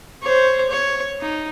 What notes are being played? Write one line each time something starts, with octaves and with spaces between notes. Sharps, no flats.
C5 C#5
C#5
D#4